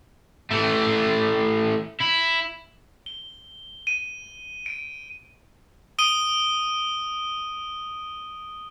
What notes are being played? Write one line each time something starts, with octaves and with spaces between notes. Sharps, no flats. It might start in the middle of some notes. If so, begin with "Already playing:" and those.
E3 A3
E4
G7
D#7
D7
D#6 D7 D#7 G7